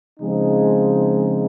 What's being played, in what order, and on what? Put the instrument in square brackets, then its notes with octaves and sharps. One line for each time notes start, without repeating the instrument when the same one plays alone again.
[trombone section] C#3 F3 G#3 C4 D#4